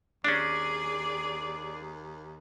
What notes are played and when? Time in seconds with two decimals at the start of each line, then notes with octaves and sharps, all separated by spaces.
0.24 D#2 C#4 D4 G#4 D5